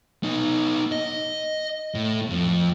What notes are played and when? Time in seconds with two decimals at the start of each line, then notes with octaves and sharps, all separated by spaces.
0.23 B3 D#4
0.92 D#5
1.95 A2
2.30 F2